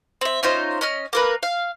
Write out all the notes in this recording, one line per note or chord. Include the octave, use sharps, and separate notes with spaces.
C4 E5
C#4 D#4 F4 C5
C#4 D#5 F6
A#3 A#4 B4
F5